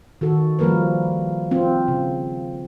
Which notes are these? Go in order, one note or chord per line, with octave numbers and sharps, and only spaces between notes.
D#3 F#4 A4
F3 G3 A#3 A#4 B4
C4 F4
C#3